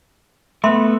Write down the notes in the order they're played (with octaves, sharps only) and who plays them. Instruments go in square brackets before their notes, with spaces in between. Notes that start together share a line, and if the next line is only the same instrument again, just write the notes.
[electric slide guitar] A3 B3 [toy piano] E5 B5 C6